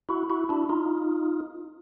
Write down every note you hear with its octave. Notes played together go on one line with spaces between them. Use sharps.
E4 F#4
E4 F#4
D4 E4
D#4 F4